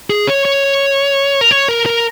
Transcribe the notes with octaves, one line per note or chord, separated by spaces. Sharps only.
G#4
C#5
C#5
A#4
C#5
A#4
A#4